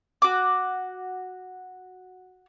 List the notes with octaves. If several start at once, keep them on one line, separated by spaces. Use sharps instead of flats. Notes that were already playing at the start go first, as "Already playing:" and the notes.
F#4 D6